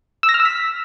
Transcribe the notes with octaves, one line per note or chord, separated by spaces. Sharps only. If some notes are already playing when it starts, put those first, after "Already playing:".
E6
A#6
F6
E6
B6